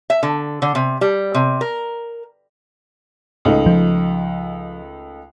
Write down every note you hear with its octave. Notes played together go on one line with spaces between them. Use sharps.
E5
D3
D3
C3
G3
C3
A#4
C#2 A3 D#4
F3